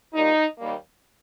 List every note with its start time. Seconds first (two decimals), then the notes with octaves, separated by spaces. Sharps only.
0.14 A#2 G3 A#3 D#4
0.58 D#2 D#3 G3 A#3